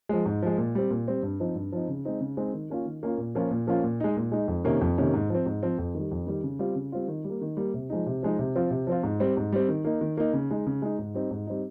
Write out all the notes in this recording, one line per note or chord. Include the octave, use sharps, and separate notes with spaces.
F3 G#3
G#2
F3 G#3
A#2
G3 C4
A#2
G3 C4
G2
F3 C4 D#4
G2
F3 C4 D#4
C#3
G#3 C4 D#4
C#3
G#3 C4 D#4
D#3
A#3 C#4 F4
D#3
A#3 C#4 F4
A#2
F3 A#3 C#4 F4
A#2
F3 A#3 C#4 F4
A#2
G#3 D#4
A#2
G#3 D#4
F2
C3 D#3 A#3 C#4
F2
C3 D#3 A#3 C#4
G#2
F3 C4
G#2
F3 C4
F2
D#3 G3
F2
D#3 G3
C#3
G3 C4 F4
C#3
G3 C4 F4
D#3
G3
A#3
D#3
G3 A#3
C3
F3 G#3 D#4
C3
F3 G#3 D#4
C3
F3 C4 F4
C3
F3 C4 F4
G#2
G3 C4
G#2
G3 C4
D#3
A#3 D#4
D#3
A#3 D#4
C#3
G#3 D#4
C#3
G#3 D#4
G#2
G3 C4 D#4
G#2
G3 C4 D#4